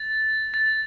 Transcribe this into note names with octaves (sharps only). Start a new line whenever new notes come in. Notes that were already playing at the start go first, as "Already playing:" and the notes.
Already playing: A6
A6